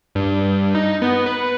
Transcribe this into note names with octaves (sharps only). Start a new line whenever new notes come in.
G2
D#4
B3
B4